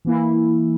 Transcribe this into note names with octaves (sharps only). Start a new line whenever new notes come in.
E3 A#3 E4